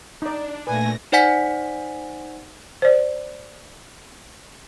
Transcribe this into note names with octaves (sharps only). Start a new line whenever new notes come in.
D4 D#4 D5
A#2 A3 B4 G#5 A#6
D#4 C5 D5 F#5 G#5 B6
C5 D5